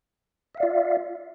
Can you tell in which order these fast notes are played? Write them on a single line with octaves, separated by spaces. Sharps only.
E5 F5 D5 F4